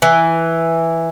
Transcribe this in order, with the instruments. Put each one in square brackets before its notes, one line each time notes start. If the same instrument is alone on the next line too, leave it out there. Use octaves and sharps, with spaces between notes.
[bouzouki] E3